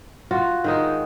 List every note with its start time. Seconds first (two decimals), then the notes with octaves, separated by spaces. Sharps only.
0.31 F4 F#4
0.64 D#3 G#3 D#4